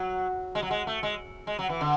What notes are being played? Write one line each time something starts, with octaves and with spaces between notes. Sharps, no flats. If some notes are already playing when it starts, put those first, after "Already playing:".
Already playing: F#3
G#3
F#3
G#3
A3
G#3
G#3
F#3
E3
D3